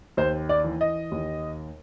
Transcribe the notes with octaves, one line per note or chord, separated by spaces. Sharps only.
D#2 C5
D5
E3
D#5
D#2